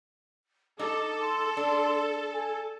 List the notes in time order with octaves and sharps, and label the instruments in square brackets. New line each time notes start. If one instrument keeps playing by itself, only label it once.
[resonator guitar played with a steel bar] D#4 [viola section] A4 [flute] D6
[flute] C6
[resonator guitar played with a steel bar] D4
[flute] G#5